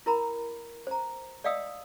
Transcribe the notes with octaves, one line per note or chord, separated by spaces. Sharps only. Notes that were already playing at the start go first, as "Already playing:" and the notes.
E4 A#4 A#5 B5
C5 A#5
D5 D#5 F5 G5 D#6 E6